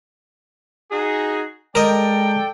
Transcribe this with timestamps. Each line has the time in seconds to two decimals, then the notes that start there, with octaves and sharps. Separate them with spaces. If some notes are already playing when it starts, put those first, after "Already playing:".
0.91 D#4 F#4 G#4
1.75 G#3 A4 A#4 D5 D#5 G5